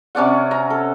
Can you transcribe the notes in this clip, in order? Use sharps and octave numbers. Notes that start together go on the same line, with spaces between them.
C3 C#4 D5 F#5
A#5
A4